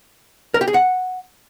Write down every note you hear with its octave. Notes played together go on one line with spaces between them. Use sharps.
A#4
G4
G#4
F#5